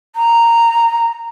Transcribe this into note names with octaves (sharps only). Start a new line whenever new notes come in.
A#5